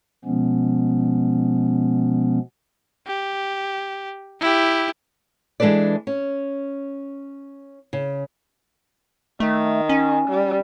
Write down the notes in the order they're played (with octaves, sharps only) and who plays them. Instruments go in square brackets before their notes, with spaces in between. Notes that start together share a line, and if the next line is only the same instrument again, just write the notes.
[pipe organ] B2 F3 G#3 B3 C#4
[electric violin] G4
E4 G4
[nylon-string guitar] E3 G#3 D4 A4 B4 D5
C#4
C#3
[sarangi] D#3 [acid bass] A3
[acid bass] C#4
[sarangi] G3